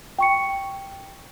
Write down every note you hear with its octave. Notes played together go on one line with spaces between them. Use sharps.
G5 C#6 C#7